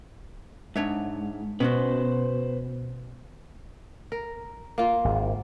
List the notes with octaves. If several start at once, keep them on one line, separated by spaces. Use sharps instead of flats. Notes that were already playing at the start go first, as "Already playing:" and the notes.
G#2 D4 C#5 E5
B2 C#4 F4 F#4 B4 C5
A#4
A#3 F4
G#1